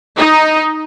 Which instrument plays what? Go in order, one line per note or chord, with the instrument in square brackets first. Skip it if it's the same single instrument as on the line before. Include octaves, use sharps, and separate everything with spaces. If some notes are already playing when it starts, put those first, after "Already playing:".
[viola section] D#4